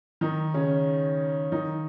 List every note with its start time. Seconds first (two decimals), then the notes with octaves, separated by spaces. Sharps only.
0.21 D#3 D#4
0.54 C#3 C#4
1.52 D#3 D#4